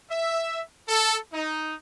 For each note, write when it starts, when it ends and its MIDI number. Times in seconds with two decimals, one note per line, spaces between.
0.11 0.60 76
0.88 1.17 69
1.33 1.74 63